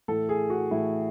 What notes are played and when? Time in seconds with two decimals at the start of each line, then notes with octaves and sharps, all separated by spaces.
0.08 A2 E3 A4
0.29 G#4
0.50 F#4
0.71 A2 E3 E4